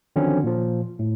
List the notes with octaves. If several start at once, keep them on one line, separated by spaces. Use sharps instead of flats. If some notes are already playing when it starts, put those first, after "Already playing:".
D3 D#3 F3 F#3 C4 C#4
A#2 F3
A2